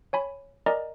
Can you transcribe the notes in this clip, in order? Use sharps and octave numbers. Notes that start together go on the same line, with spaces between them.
C#5 G#5 B5
A#4 D5 D#5 G#5 A#5